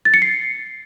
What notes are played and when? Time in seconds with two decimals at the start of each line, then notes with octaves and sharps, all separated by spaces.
0.05 A6
0.14 C#7
0.22 C7